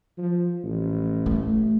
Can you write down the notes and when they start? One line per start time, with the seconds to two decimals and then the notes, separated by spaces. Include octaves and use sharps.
0.18 F3
0.63 A1
1.26 A3